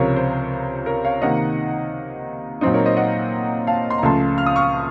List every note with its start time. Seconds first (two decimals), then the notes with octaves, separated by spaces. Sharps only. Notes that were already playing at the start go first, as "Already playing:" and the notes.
Already playing: C#2 C3 F3 A#4 C#5
0.16 C5
0.86 A#4 C#5
1.04 C#5 F5
1.22 C3 D#3 A#3 D#4 D#5 F#5
2.61 A#2 F#3 C4 D#4 C5 D#5
2.73 A#4 C#5
2.85 C5 D#5
2.97 D#5 F#5
3.67 F5 A5
3.90 C6
3.98 A#5
4.03 C#2 C#3 F3 A3 A5 C6
4.38 F6
4.46 D#6
4.56 C#6 F6